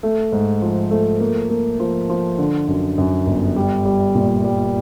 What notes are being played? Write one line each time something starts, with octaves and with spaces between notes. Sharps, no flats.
A3
G#2
F3
A3
A#3
A#3
F3
F3
D3
F#2
F#2
G1
G3
G3
A#2
G3